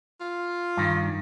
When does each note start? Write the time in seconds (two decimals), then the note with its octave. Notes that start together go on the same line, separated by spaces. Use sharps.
0.20 F4
0.77 G2 D#3